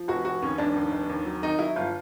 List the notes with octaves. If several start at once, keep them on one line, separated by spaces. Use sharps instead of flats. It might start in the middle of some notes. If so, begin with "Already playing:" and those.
Already playing: F3
F1 F#4
F1 F#4
D#2 C#4
F1 D4
D#2
F1
D#2
F#3
D#3 D#4
F#3 E4
G1 F4